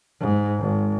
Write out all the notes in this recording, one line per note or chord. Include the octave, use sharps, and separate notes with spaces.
G#2
G#1